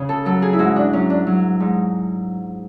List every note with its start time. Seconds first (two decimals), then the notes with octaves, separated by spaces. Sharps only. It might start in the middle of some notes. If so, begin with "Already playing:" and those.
Already playing: C#3
0.09 A4
0.25 F#3 A4
0.42 G#4
0.53 E4
0.59 G#2 F#4
0.76 D4
0.93 F#3 C#4
1.10 D4
1.27 F#3
1.60 G#2